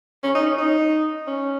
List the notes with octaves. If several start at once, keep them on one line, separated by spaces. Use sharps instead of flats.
C#4
D#4
C#4
D#4
C#4